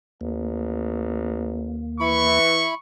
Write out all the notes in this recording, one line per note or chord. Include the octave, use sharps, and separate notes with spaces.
A1 D#2 A#3
E3 E4 B5 C#6